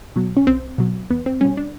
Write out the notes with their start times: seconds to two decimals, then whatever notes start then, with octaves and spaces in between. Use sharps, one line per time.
0.16 B2 F#3
0.37 C#4
0.47 C2 C4
0.78 B2 F#3
1.10 E2 B3
1.26 C4
1.41 B2 G3 C#4
1.57 D4